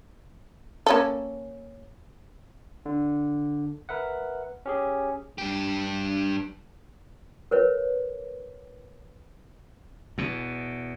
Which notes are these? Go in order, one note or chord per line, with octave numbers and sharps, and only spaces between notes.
A#3 C#4 A4
D3
A#4 B4 E5 F#5
C#4 G4 G#4
G2 G4
A#4 B4 C#5
E2 B2